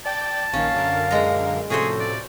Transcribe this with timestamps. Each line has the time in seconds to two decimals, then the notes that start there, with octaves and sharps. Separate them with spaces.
0.06 D5 G5 A5 A6
0.53 A#1 D#3 A#3 C#4 F5
0.74 F#2 D3 A#4
1.11 A#2 G#3 A#5
1.70 A2 C3 F3 C#4 F#4 G#4 A4 C5
2.00 D5